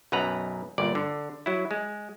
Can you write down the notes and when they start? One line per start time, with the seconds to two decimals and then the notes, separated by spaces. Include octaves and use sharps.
0.12 B1 F#2 B4 F#5 A#5
0.78 G1 A#2 D5
0.95 D3
1.46 F#3 E4
1.71 G#3